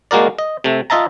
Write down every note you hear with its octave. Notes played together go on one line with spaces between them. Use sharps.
G#3 A#3 F#4 A#4 D5
D#5
C3 A3
F4 D#5 E5 A5 A#5